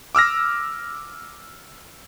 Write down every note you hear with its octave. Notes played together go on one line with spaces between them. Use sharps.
D6 E6 F6 A#6